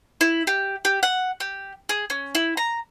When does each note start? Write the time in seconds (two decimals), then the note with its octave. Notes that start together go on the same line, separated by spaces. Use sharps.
0.21 E4
0.47 G4
0.85 G4
1.03 F#5
1.40 G4
1.89 G#4
2.10 C#4
2.35 E4
2.57 A#5